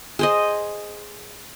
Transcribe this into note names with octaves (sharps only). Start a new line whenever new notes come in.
G#4 C5 D#5